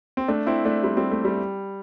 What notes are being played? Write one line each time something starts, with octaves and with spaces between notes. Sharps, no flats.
C4
A3 D4
C4 E4
A3 D4
G3 C4
G3 C4
A3
G3